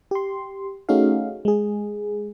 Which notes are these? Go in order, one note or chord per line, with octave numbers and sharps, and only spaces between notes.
G4 C6
A3 C#4 D#4 F#4 G#4 F5
G#3 G#4